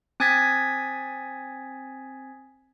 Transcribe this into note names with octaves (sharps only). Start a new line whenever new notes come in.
C4 G#5 D#6 G#6 A6 B6